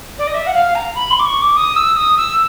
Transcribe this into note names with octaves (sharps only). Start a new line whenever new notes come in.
D5
D#5
E5
F#5
F5
A#5
B5
C6
D6
C#6
D6
D#6
E6
D#6
E6